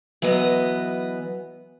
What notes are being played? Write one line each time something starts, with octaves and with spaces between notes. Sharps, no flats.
E3 F#3 B3 D#5